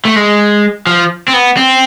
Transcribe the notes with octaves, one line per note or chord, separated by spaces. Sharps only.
A3
G#3
F3
C4
B3
C4